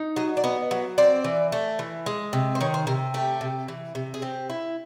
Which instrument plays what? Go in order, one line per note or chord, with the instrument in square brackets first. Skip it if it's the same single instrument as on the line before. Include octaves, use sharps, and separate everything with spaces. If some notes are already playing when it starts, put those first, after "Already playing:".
Already playing: [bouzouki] D#4
F#3 D#5
D5
B3 D#5
F#3
C4 D5
E3
A3
E3
G#3
C3
C5
D#3 C#5
C5
C3 A#4
A3 G4
C3
E3
C3
G#4
C4 G4
E4